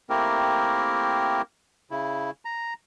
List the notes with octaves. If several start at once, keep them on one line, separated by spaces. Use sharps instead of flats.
A3 A#3 C4 E4 G4 A#4
C#3 E4
A#5